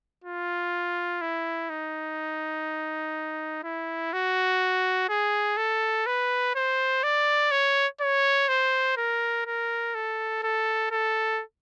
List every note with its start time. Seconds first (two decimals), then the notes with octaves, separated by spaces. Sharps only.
0.24 F4
1.21 E4
1.70 D#4
3.63 E4
4.13 F#4
5.09 G#4
5.57 A4
6.06 B4
6.55 C5
7.03 D5
7.51 C#5
8.01 C#5
8.48 C5
8.97 A#4
9.46 A#4
9.94 A4
10.43 A4
10.91 A4